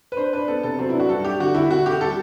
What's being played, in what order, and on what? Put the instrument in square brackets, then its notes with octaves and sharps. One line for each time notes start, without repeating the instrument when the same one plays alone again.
[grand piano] B4
[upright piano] D4 [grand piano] C5
[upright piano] D4 [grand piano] B4
[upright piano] B3 [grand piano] A4
[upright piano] C3 [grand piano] A4
[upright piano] F#3 [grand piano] C4
[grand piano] E4
[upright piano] D4
[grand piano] F#4
[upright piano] G2 [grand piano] A4
[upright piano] D4 [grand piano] G4
[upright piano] D3 [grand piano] F#4
[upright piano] D2 [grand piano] E4
[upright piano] D2 [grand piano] F#4
[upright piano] D2 [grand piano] G4
[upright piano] G3 [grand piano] A4